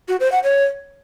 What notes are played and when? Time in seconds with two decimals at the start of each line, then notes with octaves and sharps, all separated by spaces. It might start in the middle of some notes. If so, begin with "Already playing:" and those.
0.08 F#4
0.20 C5
0.32 F#5
0.44 C#5